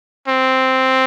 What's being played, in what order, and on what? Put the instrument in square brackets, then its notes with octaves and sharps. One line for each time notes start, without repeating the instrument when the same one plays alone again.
[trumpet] C4